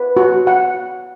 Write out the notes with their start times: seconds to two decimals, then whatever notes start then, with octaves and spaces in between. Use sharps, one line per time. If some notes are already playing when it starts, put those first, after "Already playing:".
Already playing: B4
0.17 F#4
0.47 F#5